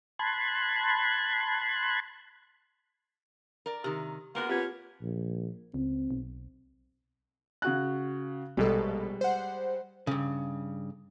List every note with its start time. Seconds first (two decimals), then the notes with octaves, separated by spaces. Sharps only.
0.19 A5 B5 C6 F#6 G#6
3.66 A#4 D5
3.84 C3 D#3 G4
4.35 G#3 A#3 B3 F4 F#4 A#4
4.49 F3 C4 F4 G4 B4 C#5
5.02 A#1
5.74 C#2 C4
6.11 B1
7.62 C#3 F#4 F#6
8.57 A#1 B2 G3 G#3 A4
9.21 C5 F#5
10.07 G2 C#3